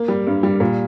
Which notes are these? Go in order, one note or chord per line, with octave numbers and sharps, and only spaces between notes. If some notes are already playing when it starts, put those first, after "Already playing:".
Already playing: A#3
G3
G2
G3
A#2